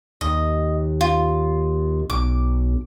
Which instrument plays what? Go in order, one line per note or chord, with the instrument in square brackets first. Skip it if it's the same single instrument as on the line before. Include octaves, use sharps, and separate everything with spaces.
[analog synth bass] D#2 [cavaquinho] D#5
[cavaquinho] F4
[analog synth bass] B1 [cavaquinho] D6